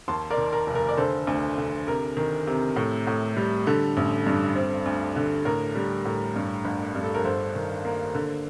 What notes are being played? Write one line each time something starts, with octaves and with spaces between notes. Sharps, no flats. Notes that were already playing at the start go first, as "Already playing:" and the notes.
D#2 A5 C6
A#4 D5
D#3
A#4
F1
A#4
D5
D3 A4 C5
D2
D3
C3 A#4
D#3
C3
A2
A2
G3
D3 A4
A1
G2
C4
D2
D3
A2 A#4
G3
A2
G2
G1
G2
A4
A#4
G1 A4 C5
D#3
A#3
D3